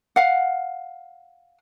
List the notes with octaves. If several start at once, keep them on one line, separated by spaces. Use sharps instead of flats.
F5 F#5